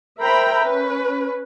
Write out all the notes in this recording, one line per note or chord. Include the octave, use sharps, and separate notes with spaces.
A#4 C5 E5 G5 A#5 B5
C#4 B4